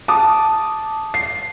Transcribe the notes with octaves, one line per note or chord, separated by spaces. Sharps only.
A5 D6 D#6
C7